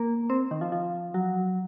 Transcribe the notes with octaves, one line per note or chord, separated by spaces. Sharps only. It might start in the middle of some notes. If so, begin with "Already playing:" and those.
Already playing: A#3
C4
D#3
F3
F3
F#3